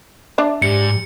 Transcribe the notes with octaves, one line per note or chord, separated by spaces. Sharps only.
D4 D5 E5
G#2 G4 C#7